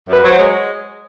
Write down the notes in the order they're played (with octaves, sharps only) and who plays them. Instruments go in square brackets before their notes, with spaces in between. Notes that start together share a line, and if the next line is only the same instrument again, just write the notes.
[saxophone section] F#2 [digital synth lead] B4
[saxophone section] F#3 [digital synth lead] C5
[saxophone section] G#3 [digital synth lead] C#5